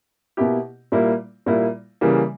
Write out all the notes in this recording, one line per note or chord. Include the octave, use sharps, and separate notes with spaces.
B2 A#3 E4 G4
A#2 G3 A#3 E4
A#2 G3 A#3 E4
C#3 E3 G3 A#3